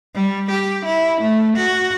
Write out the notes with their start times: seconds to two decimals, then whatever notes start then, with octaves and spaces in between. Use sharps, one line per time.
0.15 G3
0.51 G4
0.85 E4
1.21 A3
1.57 F#4